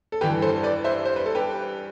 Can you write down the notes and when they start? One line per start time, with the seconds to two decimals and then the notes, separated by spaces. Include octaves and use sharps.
0.12 A4
0.21 G2 E3 G4 B4
0.42 A4 C5
0.63 B4 D5
0.84 C5 E5
1.06 C5
1.16 B4
1.26 A4
1.35 G4 B4